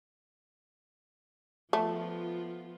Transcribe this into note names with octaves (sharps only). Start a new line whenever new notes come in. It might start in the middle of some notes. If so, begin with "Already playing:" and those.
F3 A3 B3 F4